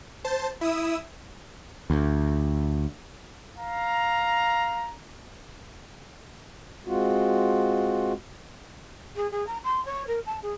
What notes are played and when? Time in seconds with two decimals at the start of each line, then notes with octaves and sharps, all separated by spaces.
0.24 C5 A5
0.61 E4 D#6 E6
1.90 D2
3.59 F5 A#5
6.86 G#3 C4 F4 F#4
9.16 G#4
9.31 G#4
9.47 A#5
9.64 C6
9.86 C#5
10.07 A#4
10.26 A5
10.43 G#4